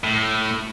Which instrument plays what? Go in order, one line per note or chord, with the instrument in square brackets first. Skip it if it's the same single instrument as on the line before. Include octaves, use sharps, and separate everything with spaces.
[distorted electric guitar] A2